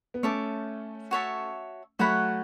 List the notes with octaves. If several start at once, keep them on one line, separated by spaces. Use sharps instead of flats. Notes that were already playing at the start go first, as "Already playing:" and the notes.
B3
A3 C#4 C#5 E5 A5 D6
F#4 C#5 E5 A5
F#3 A3 F#4 C#5 F#5 B5